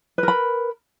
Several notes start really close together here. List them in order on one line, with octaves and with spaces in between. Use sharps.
B4 A#4 B5